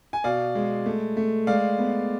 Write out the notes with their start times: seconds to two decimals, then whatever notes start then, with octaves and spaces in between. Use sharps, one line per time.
0.13 G#5
0.24 B2 D5 F5
0.55 G#3
0.86 A3
1.17 A3
1.47 G#3 D5 F5
1.78 B3